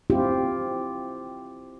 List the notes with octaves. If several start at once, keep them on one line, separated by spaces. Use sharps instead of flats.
C4 E4 F4 G4